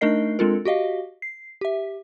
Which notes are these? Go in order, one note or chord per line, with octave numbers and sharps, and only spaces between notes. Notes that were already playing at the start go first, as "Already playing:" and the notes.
A3 D4 D#4 A#4 D#5 C7
G#3 C4 D4 F4 A4 A#4
F#4 G4 D#5 F5
C7
G4 E5